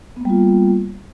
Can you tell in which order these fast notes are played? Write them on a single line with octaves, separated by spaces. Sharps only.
B3 A#3 G3 F4